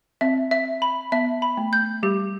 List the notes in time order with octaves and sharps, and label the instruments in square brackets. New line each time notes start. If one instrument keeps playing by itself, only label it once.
[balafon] C4 [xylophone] E5
[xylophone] E5
B5
[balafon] B3 [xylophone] E5
[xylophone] B5
[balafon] A3
[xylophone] G6
[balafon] G3 [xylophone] G4